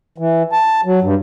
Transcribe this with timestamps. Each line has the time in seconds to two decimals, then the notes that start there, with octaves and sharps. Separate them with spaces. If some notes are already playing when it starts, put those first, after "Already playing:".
0.18 E3
0.52 A5
0.85 F#3
1.02 G2